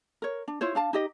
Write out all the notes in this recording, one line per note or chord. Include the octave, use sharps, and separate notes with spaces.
A#4 C#5
D4
E4 F4 C5 C#5
D4 F5 A5
D#4 G4 D#5